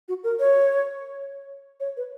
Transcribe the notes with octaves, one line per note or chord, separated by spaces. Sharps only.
F#4
A#4
C#5
C#5
B4